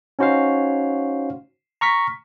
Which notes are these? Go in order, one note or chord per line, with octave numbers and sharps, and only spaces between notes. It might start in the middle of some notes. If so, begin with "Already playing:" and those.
C#4 D#4 F#4 C5 C#5 F5
A#5 C#6 F6 B6